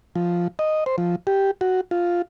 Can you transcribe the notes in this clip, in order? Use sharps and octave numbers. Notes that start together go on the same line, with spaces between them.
F3
D#5
C5
F3
G4
F#4
F4